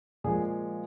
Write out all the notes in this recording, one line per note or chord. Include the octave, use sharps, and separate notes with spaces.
A#2 F3 G#3 G#4